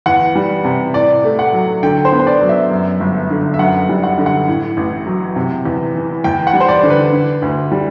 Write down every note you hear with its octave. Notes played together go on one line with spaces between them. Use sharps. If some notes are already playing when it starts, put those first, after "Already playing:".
E2 F#5
G3
C3
A2 D5
A3
F#5
F#3
D3 G5
C5
B3
C5
D5
F#3
E5
F#2
G1
D3
E5
F#2 F#5
G3
F#5
D3
F#5
A2
A1
F#3
C3
E2
E3
E2 G5
F#5
G3
C5
D5
D3
B4
D3
D2
G3